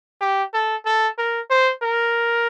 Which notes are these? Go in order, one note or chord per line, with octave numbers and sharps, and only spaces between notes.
G4
A4
A4
A#4
C5
A#4